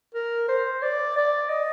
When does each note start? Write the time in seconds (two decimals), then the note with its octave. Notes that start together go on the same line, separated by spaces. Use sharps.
0.15 A#4
0.48 C5
0.82 D5
1.17 D5
1.50 D#5